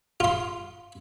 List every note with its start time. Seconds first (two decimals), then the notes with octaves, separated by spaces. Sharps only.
0.20 F4 C6